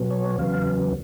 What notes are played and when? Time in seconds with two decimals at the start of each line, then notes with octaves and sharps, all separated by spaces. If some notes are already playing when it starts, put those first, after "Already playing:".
Already playing: B2 F#3 B3
0.10 C#5
0.38 E2 C#3 F#3 B3 F5